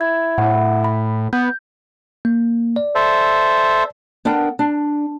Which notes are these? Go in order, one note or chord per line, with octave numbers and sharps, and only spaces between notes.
E4 G#6
A2 F#5
B5
B3 G6
A#3
D5
A4 C5 E5
B3 D4 A#4 F#5 G5
D4